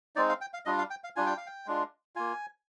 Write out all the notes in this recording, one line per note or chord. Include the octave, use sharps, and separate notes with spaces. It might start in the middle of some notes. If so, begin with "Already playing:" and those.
G#3 C4 D#4 D5
F5
G5
F5
G3 D4 F4 D#5
F5
G5
F5
G3 D4 F4 G#5
G5
F5
G5
G#3 D4 F4
A#3 F4 G#5